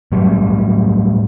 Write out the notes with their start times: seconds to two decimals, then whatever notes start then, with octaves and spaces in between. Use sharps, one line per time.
0.12 A2 F#3 G3